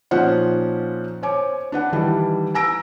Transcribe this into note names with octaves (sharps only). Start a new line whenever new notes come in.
A#2 F3 C#4 D#4 C5 F#5
C5 C#5 G#5 D6
D4 B4 F#5
D#3 E3 G3 A5
G#5 A#5 E6 A#6 D7